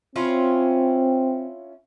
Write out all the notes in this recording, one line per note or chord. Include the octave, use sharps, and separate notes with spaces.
C4 C#4 E4 F4